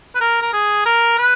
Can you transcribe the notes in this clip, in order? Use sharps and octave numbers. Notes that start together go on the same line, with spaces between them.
B4
A#4
A#4
G#4
A#4
B4